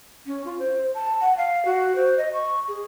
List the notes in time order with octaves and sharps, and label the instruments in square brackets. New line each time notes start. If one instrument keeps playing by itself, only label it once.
[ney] C#4
F4
C5
A5
F#5
F5
F#4
C5
D#5
C#6
G#4